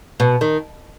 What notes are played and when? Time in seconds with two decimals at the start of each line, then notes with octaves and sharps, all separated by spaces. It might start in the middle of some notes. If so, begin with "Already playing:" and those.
0.20 B2
0.41 D#3